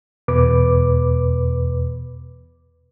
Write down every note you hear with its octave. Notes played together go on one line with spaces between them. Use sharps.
E2 B2 B4 D6